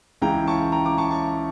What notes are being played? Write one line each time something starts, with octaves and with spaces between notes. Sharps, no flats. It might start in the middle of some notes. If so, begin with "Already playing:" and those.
C#2 C#3 E3 G5 A#5
A5 C#6
G5 A#5
A#5 D6
A5 C#6
A5 C#6